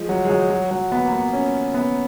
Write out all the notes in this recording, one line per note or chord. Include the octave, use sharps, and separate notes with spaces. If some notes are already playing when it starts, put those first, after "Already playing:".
Already playing: F3 G#3
F#3
G#3
F#3
F#3
F#3
B3
A#3
B3
C#4
B3